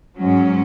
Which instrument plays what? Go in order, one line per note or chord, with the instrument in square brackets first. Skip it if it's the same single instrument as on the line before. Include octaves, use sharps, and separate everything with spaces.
[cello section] G#2 F#3 C#4